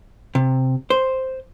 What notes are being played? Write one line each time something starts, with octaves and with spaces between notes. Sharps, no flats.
C3
C5